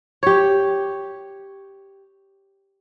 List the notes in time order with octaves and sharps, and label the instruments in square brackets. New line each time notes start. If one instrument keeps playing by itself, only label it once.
[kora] G4 C#5